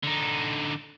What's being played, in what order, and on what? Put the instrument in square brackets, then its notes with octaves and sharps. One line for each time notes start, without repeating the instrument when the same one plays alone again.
[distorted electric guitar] D3 D#4